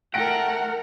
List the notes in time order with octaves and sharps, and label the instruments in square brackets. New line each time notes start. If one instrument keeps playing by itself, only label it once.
[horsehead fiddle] A3 A#4 [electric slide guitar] F#5 [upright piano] G5 A#6 D7